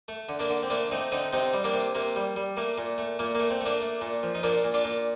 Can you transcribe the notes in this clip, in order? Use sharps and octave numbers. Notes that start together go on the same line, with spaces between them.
A3
D3
A#3 D4
D3
C4
A3 A#3 D4
A3 C4 D#4
D3 C4 D#4
C3 C4 D#4
G3
A#3 D4
C3
C3 A#3
G3
G3
A3 A#3
A#2
A3
A#2 A#3
A3 A#3
C4
A3 A#3 D4
A3
A#2
F3
D#4
A#2 A#3 D4
A#2
D4 F4
A#2